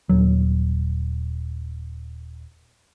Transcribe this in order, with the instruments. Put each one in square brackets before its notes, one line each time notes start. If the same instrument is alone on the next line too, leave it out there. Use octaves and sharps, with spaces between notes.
[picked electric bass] D#1 F#3